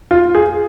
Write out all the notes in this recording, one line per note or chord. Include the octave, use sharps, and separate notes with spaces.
F4
G#4